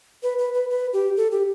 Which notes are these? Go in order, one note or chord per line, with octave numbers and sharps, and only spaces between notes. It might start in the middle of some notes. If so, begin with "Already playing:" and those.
B4
B4
B4
B4
G4
A4
G4